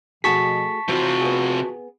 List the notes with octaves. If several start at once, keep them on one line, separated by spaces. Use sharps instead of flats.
B2 F3 A3 F#4 G#4 A5 C#6 B6
C3 E3 F3 F4 F#4
B3 G#4